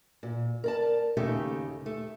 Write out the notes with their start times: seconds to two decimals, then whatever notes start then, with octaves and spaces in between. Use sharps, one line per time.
0.23 A#2
0.64 A#4 D5 A5
1.17 D#2 C#3 A3 D#4 G4
1.86 A3